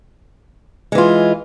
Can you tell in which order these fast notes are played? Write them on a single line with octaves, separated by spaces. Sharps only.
G#3 E3 F4